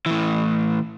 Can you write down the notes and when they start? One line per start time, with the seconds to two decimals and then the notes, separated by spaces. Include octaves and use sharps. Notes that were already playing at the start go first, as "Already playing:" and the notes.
0.06 A2 E3